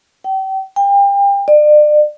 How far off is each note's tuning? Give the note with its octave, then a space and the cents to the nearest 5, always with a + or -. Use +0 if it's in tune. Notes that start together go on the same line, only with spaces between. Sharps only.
G5 -35
G5 +35
D5 +35